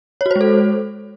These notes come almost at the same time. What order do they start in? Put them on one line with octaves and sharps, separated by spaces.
C#5 F#4 C5 G#3 A4